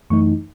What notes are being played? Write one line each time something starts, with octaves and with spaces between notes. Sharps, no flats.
F#2 E3 A3 D#4 C#6